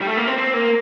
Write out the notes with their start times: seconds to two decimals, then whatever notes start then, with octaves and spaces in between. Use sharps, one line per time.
0.01 G3
0.07 A3
0.17 A#3
0.27 C4
0.38 C4
0.54 A#3